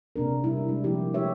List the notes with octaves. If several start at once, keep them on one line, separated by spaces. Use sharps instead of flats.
C3 A#3 D4 A#4
G3 D4 E4
G#3 D4
F3 A#3 E4 G4
A3 E4 G4 C#5 E5